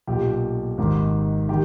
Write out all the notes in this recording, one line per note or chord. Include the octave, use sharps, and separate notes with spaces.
B1 A#2 G4
G#1 G#2 D#3
D#3 G4